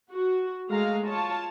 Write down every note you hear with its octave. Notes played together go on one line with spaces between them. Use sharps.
F#4
G#3 A3 F5 A#5
F4 C#5 A5